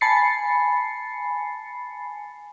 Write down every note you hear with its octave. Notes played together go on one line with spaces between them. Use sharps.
G#5 A5 B5 A6 C7 C#7